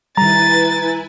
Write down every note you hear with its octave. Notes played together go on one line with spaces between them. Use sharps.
D#3 G3 E4 B4 G#5 A#5 A6